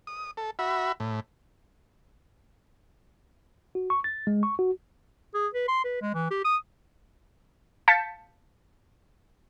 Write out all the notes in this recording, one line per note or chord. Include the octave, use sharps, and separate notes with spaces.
D#6
A4
F#4 E5 B5
A2
F#4
C#6
A6
G#3
C#6
F#4
G#4
B4
C6
B4
G#3
E3
G4
D#6
F5 A5 G6 A6 B6 C#7